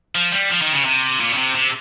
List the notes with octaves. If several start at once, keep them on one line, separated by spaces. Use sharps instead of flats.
F3
G3
F3
D#3
C#3
C3
A#2
C#3
C3
C3